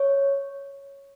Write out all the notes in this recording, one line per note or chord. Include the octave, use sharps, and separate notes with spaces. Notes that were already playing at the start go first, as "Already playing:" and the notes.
Already playing: C#5